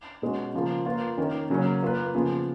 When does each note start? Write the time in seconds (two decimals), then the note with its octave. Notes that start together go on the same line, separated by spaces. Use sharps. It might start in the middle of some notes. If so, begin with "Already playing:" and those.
0.22 B2 G#3 C#4 F#4
0.54 C#3 F3 A#3 F4
0.86 A#3 F4 B4
1.17 D#3 A#3 C#4
1.50 C#3 F#3 A#3 C#4
1.83 A#3 F4 B4
2.14 C#3 F3 B3 F4 G#4